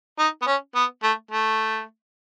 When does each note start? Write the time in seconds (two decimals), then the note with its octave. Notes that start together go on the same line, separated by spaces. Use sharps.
0.19 D#4
0.42 B3
0.47 C#4
0.76 B3
1.03 A3
1.31 A3